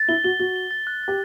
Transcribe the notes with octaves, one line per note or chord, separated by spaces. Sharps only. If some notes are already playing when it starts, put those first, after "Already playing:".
Already playing: A6
E4 G7
F#4 G7
F#4 A6
G7
A6
F#6
G4 A6